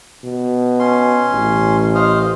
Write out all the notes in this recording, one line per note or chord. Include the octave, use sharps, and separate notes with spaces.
B2
C#4 C6
A1
C5 D#5 F5